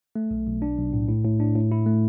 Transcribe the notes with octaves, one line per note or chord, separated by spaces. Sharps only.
A3
B1
B1
D4
B1
A2
A2
A2
D4
A2
E4
A3